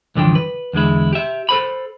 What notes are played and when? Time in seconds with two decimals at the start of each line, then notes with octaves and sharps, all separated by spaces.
0.15 C2 F#2 D3 E3 F3 G5
0.35 B4
0.73 E2 D3 G#3 E4
1.13 G4 E5
1.49 A4 C5 B5